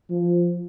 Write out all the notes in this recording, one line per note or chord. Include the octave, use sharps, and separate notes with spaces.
F3